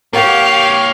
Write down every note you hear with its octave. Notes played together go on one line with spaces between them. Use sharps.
A#3 G4 A#4 C#5 F5 F#5